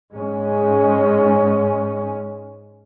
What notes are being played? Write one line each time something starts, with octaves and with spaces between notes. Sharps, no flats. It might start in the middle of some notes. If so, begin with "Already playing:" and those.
G#2 G#3 C#4